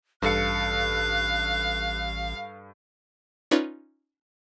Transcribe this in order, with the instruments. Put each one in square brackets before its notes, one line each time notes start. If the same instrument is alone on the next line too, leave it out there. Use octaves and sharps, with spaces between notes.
[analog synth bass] A1 [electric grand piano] G2 A4 C#7 [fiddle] F5 [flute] F#6
[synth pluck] C#4 D#4 F4 B4 C#5 D5